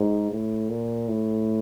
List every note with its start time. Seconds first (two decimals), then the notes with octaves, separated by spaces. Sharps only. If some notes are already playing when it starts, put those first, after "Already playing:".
Already playing: G#2
0.32 A2
0.69 A#2
1.08 A2